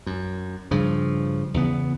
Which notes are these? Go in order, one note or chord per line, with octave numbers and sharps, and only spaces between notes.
F#2
G2 C#3 F3
E2 C#3 B3